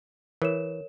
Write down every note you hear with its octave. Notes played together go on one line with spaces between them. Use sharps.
E3 A#4 C#5 E7